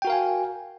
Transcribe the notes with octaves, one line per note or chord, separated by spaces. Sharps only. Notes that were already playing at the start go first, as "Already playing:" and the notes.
F#4 A#4 F5 G5 G#5